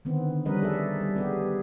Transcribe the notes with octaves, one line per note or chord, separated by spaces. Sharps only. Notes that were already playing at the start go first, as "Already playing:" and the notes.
D3 D#3 B3 C4
F3 G3 C#4 A#4 B4 D#5
G#4 A4 E5
G3
B3 G4 G#4